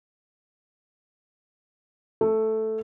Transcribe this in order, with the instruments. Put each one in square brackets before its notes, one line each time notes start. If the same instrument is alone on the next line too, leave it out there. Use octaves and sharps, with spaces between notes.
[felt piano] A3